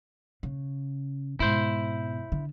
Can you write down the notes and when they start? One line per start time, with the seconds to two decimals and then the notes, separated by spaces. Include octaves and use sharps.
0.43 C#3
1.40 G#2 B2 E4 C5
2.32 D3